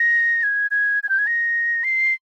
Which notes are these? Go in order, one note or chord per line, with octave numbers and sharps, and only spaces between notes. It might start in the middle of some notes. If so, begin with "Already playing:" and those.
Already playing: A#6
G#6
G#6
G#6
G6
G#6
A#6
C7